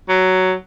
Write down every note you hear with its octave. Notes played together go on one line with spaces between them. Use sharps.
F#3